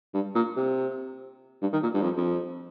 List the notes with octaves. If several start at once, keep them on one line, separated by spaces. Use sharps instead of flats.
G2
A#2
C3
G2
D#3
A#2
G2
F2
F2